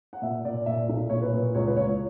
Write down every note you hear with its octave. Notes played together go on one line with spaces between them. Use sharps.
F#5
A#2 E5
A#2 D5
A#2 E5
B1
A#2 C#5
B4
A#2
C#2 C#5
B4
C#2 C#5